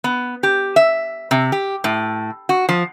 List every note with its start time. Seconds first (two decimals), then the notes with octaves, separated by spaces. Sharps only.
0.04 B3
0.43 G4
0.76 E5
1.31 C3
1.52 G4
1.84 A2
2.49 F#4
2.69 F3